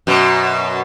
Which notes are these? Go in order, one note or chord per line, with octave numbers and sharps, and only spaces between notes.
F#2 B2